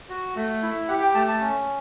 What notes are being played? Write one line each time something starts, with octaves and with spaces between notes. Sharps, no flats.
F#4
A3
E4
G4 F#5
G5
A3 A5
A5
C#4